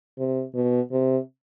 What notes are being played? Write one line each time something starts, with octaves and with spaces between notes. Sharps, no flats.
C3
B2
C3